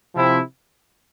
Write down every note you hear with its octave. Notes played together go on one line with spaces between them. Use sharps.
C3 F3 C4 E4